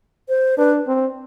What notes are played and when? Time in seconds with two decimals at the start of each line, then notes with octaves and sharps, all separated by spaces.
0.29 C5
0.58 D4 B4
0.87 C4